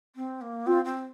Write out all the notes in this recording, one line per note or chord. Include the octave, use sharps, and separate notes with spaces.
C4
A#3
C4 F4
C4